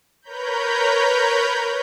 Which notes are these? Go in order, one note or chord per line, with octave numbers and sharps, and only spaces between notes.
A#4 B4 C#5 A#5 B5 G6